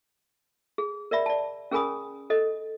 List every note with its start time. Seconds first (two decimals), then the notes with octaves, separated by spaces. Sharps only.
0.78 G#4
1.11 A#4 D5 E5 B5
1.26 D5 A5
1.71 C#4 G#4 A#4 G#5 B5 D#6
2.30 A4 D#5